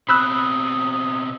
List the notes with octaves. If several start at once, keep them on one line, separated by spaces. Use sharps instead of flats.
B2 C4 B5 D#6 E6 F#6